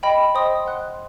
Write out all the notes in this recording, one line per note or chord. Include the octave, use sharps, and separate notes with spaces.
D#5 G5 B5
C5 D#5 G5 C6 D#6
F#5 C6 F#6